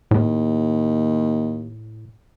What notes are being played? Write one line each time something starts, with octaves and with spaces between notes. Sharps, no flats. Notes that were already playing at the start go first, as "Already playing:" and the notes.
D#2 A2